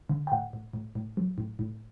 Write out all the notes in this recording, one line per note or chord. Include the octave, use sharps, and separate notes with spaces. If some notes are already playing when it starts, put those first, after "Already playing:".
D3
G5
A2 F#5
A2
A2
A2
F#3
A2
A2